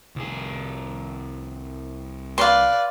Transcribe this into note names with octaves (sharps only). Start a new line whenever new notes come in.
C2 G#4
B4 D5 F5 C6